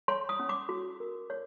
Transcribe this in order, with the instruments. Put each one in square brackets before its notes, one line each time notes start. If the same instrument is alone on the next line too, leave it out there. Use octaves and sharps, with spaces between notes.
[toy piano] C#5 C6
D#6
C#4
D6
F#4
A#4
C#5